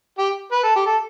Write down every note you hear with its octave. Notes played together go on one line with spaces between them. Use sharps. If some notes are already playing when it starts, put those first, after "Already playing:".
G4
B4
A4
G4
A4